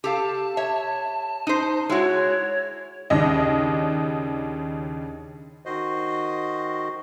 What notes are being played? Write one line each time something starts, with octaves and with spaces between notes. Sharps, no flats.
G4 A4 F5 A5
C#5 E5
D#4 C5
G#3 E4 F#4 C#5
D#2 C#3 D4 D#5
D#3 F#4 C5 D#5